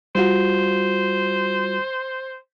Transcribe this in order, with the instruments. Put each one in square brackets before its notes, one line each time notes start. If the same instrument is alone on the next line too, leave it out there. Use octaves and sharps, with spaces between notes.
[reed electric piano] G3 F4 F#4 [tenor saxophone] C5